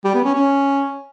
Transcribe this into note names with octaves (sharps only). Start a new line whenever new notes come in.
G3
B3
C#4
C#4